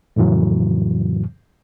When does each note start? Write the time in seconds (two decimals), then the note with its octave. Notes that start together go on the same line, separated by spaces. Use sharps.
0.16 F2 A2 C#3 E3 F#3